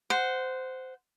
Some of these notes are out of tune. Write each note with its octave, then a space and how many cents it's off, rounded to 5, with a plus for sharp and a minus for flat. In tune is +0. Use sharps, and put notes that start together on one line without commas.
C5 -15 F#5 +0